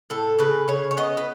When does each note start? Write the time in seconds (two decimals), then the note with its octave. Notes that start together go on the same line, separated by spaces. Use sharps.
0.10 A2 A4
0.39 C#3 B4
0.68 C#3 C#5
0.91 C#5
0.97 B3 D#5
1.17 B4